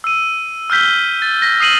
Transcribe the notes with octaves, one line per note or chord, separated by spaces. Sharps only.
E6 D#7
E6 F6 G6 B6 G7
A6
A#6 B6
D#6 C7 D#7 F#7